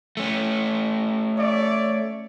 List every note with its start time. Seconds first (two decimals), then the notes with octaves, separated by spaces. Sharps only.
0.17 A3 C#4
1.38 C#5 D5 E5